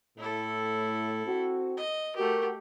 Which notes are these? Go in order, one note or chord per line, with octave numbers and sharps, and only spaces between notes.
A2 E4 A4
C4 F#4
D#5
A3 F#4 G4 A#4